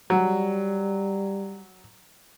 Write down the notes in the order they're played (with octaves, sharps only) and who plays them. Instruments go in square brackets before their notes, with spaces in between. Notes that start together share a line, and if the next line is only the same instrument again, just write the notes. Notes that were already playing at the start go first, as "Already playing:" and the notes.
[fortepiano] F#3 [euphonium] G3